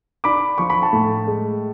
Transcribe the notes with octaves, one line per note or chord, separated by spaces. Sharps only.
D4 B5 D6
F3 C#6
B5
A5 C#6
A2
G#3